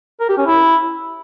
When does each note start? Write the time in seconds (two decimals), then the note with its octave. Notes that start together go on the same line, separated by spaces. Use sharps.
0.20 A#4
0.29 G4
0.38 C#4
0.47 E4